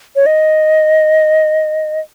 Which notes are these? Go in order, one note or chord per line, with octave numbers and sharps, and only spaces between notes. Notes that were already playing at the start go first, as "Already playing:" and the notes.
C#5
D#5